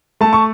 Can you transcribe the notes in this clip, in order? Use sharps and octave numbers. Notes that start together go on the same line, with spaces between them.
A3 A5
C#6